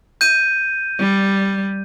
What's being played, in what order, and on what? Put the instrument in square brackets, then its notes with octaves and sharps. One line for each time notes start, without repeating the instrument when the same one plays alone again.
[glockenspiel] G6 D#7
[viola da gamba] G3